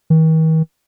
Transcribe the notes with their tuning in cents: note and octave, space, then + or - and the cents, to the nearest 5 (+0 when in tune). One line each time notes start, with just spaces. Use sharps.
D#3 +45